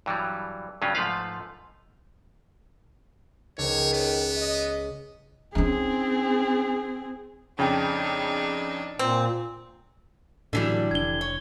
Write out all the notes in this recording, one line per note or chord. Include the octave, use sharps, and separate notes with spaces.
G2 E3 F#3 G3
G2 C#3 F#3 C#4 F4
G#2 F3 A3 F4 B4 F5
C#2 D#3 C#5
B3 C#5
D#5
C4 C#4 D#4 G#4
F2 C#3 D4 D#4 G5
A#2 C4
A2 D3 E3 F#3 G3
F1 D4 G#6 G7
C#5